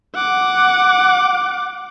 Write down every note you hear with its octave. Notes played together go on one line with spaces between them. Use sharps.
F#5 D6